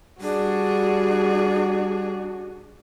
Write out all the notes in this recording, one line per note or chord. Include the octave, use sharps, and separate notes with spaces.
G3 D4 F#4 G#4